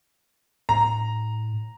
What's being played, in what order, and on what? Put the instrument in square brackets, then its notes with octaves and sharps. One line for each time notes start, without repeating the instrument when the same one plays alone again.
[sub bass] A2 [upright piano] A#5